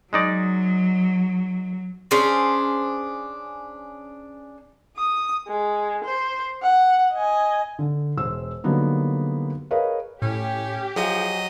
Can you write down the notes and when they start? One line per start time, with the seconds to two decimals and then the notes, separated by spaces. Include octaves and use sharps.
0.13 F#3 G#3 D#4 D5
2.11 C#4 D4 G#4 C5
4.97 D#6
5.48 G#3
6.04 C5
6.62 F#5
7.13 D#5 G#5
7.79 D3
8.17 E1 C5 E6
8.64 D3 F#3 G3 A#3 B3 D#4
9.71 G#4 A#4 B4 C#5 D#5 F5
10.22 A2 C#4 G4
10.96 F3 F#3 G#4 D#5 D#6